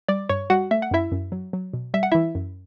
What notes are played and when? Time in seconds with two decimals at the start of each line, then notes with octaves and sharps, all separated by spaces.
0.08 G3 D5 D6
0.29 G2 C#5 C#6
0.50 G3 F#4 F#5
0.71 A3 E5
0.82 F#5
0.91 F#2 E4 E5
1.12 F#2
1.32 F#3
1.53 F#3
1.74 B2
1.94 G3 E5
2.03 F#5
2.12 E3 E4 E5
2.35 F#2